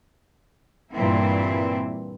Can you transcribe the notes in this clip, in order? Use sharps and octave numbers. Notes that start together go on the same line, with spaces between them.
G2 A#2 E3 C4 E4